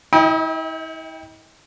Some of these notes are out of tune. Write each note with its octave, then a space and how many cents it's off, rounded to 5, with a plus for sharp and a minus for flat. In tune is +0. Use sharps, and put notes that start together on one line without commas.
E4 -40 D#5 +25 G5 +15